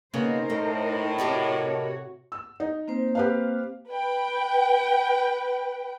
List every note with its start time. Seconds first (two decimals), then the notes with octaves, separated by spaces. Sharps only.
0.13 C#3 A#3 B3 D#4 A#4 C5
0.50 A2 A3
1.18 C3 F#4 G4 A#4 C#5 D#5
2.32 E6
2.60 D#4
2.88 A#3 C4 C5
3.15 G4 B4 F5
3.89 B4 G5